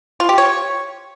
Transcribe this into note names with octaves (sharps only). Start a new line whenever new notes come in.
F4
G4
C#5